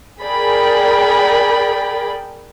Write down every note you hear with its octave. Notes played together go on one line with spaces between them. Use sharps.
G#4 A#4 D5 G5 B5